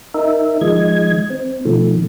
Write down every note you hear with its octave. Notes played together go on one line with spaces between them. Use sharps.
D#4 A#4 E5
D#3 F3 G#3 D#5 G#6
C4
B2 D#3 F3 A3